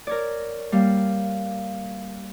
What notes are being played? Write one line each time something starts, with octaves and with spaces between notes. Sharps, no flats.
A#4 C#5 D5
G3 A#3 F5